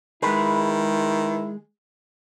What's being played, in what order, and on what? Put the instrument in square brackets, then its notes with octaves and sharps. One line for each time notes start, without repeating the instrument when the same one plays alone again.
[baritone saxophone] D#3 [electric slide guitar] G#3 G#4 [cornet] E4 [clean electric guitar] B4